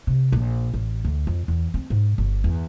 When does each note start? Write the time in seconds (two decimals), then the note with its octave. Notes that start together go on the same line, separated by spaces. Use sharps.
0.07 C3
0.32 A#1
0.74 A1
1.05 D2
1.27 F2
1.48 E2
1.74 C4
1.90 G#2
2.18 G1
2.44 E2